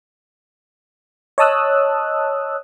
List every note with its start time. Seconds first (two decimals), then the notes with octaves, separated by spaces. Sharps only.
1.38 C#5 D#5 A5 D#6 E6 F#6